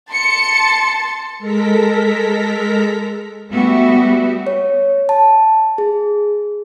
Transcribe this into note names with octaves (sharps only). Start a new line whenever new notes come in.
A5 C6 C#7
G#3 A4 A#4 A#5 B6
G3 A3 B3 F#4 G4 E5
C#5
A5
G#4